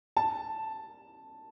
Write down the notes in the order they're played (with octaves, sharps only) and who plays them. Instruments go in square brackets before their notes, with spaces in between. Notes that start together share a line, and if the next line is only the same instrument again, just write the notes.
[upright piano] A5